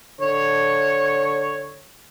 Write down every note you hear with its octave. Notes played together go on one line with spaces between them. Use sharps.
D3 C#5